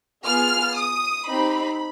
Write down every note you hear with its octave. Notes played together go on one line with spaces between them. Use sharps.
B3 F4 G#4 F6
D#6
C4 D#4 G4 B5